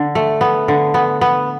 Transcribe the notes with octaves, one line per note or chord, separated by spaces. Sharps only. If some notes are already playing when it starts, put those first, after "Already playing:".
Already playing: D3
A3
B3
D3
B3
B3